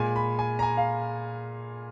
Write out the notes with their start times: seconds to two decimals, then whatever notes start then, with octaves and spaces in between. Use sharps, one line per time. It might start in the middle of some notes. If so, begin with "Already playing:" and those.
Already playing: A#2 G#3 G#5
0.16 B5
0.39 G#5
0.59 A#5
0.63 G#5
0.77 F5